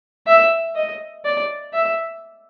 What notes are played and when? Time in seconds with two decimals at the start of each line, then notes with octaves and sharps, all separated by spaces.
0.27 E5
0.76 D#5
1.25 D5
1.73 E5